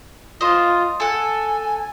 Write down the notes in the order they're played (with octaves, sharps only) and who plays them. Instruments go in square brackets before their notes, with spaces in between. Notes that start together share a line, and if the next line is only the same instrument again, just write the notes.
[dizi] F4 [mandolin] C5 D#5
[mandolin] A4 F#5 [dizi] G#5